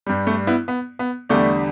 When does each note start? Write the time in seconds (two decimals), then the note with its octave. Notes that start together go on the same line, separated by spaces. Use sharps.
0.06 G2 G3
0.27 A3 D4
0.47 B3 E4
0.68 B3
0.99 B3
1.29 E2 D3 G3 A3 D4